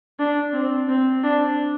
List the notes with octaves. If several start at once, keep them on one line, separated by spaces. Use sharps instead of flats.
D4
C4
C4
D4